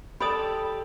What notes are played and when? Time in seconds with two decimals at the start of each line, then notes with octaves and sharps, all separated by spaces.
0.20 G4 A4 D5 B5 D#6